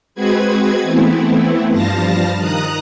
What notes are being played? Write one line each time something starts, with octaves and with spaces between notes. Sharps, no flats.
G#3 C4 F#4 G#4 B4 G#6
E3 A3 B3 C4 E4
G2 F3 G3 F5 A5 A#6
D#3 A#5 D#6 F#6